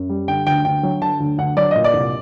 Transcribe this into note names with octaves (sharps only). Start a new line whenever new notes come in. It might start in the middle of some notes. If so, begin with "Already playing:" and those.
Already playing: F#2
G3
D3 G5
D2 G5
D2 G5
F#3
D3 A5
D2
D2 F#5
F#3 D5
A#2 D#5
D5
C2